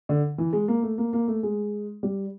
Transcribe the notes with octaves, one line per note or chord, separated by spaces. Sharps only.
D3
E3
G#3
A#3
A3
A#3
A#3
A3
G#3
G3